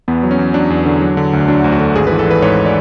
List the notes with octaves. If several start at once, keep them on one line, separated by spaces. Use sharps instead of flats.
E2 B3
F#3
C#4
E2
F#3 D4
E2
D3
F#3
D3
D2
F#3 D4
D2
F#4
D3
G#1 G#4
B4
E3
A4
E3 B4
G#2 C#5
D5